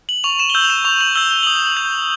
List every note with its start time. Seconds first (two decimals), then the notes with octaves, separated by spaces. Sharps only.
0.09 F#7
0.24 C#6 F7
0.40 E7
0.50 G7
0.54 E6 G6 F#7
0.65 F7
0.70 E7
0.85 C#6 F7
1.01 F#7
1.15 E6 G6 G7
1.31 G7
1.43 D#6 F#7
1.55 F7
1.67 F#7
1.77 G6